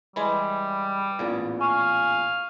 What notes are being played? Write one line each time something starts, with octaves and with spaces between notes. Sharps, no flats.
E3 G3 G#3 G#5 B5
A1 E2 A#2
F5 G#5 C#6